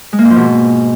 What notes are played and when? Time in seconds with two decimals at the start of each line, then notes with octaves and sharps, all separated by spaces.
0.13 G#3
0.19 A#3
0.25 G#2
0.30 F3
0.36 B2